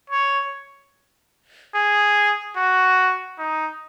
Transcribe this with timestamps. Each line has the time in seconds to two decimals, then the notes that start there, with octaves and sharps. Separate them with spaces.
0.10 C#5
1.74 G#4
2.56 F#4
3.38 D#4